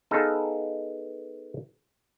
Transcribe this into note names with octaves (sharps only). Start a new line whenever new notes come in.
B3 D#4 G#4 A4 B4 F5